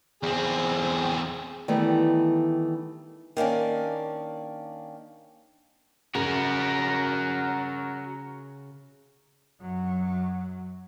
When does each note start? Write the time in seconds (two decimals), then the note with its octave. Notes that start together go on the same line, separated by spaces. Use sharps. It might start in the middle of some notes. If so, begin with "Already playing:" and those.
0.23 E2 C4 G#4
1.68 D#3 E3 G3 A3 B3
3.37 D#3 A#3 C#4 D4
6.15 C#3 F#4 A#4
9.61 F#2 F#3